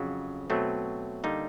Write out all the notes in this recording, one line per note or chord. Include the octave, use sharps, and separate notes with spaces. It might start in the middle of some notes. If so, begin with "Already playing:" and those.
Already playing: F2 C#3 F#3
B2 F#3 A3 C4
D3 G3 A#3 D#4